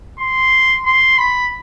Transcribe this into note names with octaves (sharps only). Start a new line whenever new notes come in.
C6
C6
B5